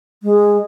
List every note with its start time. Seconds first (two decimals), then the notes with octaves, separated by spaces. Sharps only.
0.23 G#3